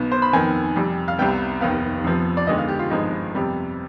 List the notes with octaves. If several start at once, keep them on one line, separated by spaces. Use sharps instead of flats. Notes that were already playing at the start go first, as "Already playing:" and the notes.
Already playing: B1 B2 B3
C5
B5
F2 D#3 B3 G#5
F2 C3 G3
F5
C2 C3 G3 B3 G5
F1 D#2 D#3 B3 F5
F2 C3 F3 B3
D5
D#2 D3 G#3 B3 D#5
F5
G4
F4
G#1 G2 F3 G#3 B3 D#4
F2 C3 G3 B3